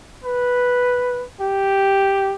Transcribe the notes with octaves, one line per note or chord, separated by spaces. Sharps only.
B4
G4